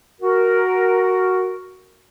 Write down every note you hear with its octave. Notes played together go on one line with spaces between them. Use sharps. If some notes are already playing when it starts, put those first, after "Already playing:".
F#4 A#4